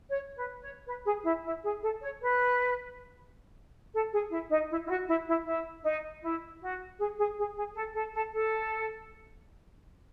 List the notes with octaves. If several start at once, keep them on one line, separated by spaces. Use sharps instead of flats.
C#5
B4
C#5
B4
G#4
E4
E4
G#4
A4
C#5
B4
A4
G#4
E4
D#4
E4
E4
F#4
E4
E4
E4
D#4
E4
F#4
G#4
G#4
G#4
G#4
A4
A4
A4
A4